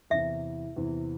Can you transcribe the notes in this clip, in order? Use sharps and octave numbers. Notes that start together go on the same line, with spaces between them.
E2 C3 E3 E5
E2 C3 E3